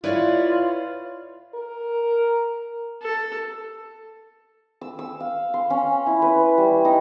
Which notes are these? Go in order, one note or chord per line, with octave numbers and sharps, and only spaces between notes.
E4 F4 B4 C#5 D5 F5
A#4
A4
E6
E6
F5
C6
C#4
E4
B4
G3
D#4